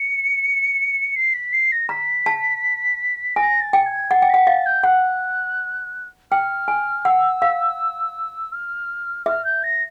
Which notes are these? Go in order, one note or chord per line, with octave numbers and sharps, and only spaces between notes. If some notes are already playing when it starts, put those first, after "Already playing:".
Already playing: C#7
C7
B6
C7
A#6
A#5 B6
A5
G#5 A#6
A6
G5
G#6
F#5 A6
G5
F#5 B6
F5 A6
G6
F#5 F#6
G5 F6
G#5
F#5 E6
F5
F6
E5 F6
G6
A#6